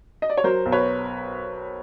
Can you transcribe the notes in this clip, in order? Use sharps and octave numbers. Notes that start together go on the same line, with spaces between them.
D#5
D5
C#5
F#3 A#4 C5
B1
B4 C#5